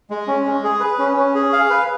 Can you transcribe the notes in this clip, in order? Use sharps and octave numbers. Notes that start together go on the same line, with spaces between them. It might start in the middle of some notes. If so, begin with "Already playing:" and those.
G#3
C#4
G#3
G#4
B4
C#4
C#4
G#4
F5
B4